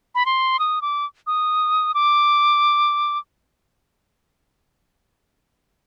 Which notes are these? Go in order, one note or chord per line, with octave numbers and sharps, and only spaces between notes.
B5
C6
D#6
D6
D#6
D6